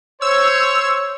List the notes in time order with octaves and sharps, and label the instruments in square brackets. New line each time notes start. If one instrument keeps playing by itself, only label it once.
[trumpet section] C5 C#5 [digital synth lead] E6